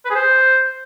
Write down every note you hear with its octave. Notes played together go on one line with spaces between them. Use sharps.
B4
G#4
C5